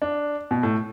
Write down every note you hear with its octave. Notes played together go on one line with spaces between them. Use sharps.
D4
B2
A2